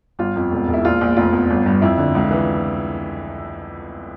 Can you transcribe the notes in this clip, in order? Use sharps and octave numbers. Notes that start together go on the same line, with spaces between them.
G1 F4
F2
E1
E1
E4
A#1 F4
A#1
F1 F4
E2
G1
G2
F2 E4
D3
C#2
E3